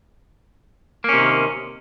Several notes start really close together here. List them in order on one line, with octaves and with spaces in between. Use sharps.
A#3 C#4 C3 D#3